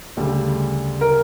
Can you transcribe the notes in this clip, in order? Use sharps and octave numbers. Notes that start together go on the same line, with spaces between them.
D2 C#3 G3 A4
A#4